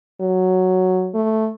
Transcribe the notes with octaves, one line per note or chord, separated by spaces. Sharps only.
F#3
A3